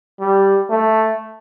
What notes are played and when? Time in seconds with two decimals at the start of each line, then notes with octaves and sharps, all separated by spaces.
0.20 G3
0.70 A3